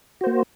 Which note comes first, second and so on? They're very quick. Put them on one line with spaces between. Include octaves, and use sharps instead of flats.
F#4 C5 A#3